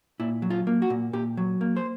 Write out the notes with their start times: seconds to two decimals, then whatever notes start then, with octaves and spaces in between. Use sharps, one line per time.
0.20 A#2 E4
0.42 F#3
0.50 F4
0.67 A#3
0.82 F#4
0.90 A#2
1.13 A#2 G4
1.37 F#3
1.61 A#3
1.77 C5